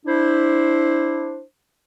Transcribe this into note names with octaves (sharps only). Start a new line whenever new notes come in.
D4 E4 C5